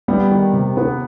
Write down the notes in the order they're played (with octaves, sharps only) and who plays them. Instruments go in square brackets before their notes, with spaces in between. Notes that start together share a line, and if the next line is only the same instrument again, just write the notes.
[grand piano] G3 [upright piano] B3
[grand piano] D#3
C3
B3